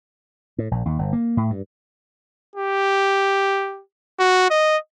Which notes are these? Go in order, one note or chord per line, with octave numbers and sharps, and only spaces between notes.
A2
A#1
D#2
G1
A#3
A2
G2
G4
F#4
D#5